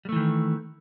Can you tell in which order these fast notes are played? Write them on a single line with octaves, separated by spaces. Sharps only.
G3 A3 E3 D#3